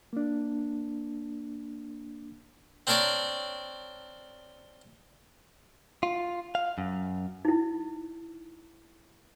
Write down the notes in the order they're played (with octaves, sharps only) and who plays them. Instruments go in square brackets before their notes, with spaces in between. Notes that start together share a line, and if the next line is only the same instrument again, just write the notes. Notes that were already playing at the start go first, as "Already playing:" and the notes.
[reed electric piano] A#3 D4
[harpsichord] C4 D4 A#4 C#5 D5
[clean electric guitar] F4
F5
F#2
[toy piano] D#4 E4